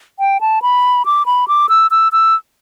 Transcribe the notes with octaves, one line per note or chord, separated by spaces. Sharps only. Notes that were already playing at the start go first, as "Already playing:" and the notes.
G5
A5
B5
D6
B5
D6
E6
E6
E6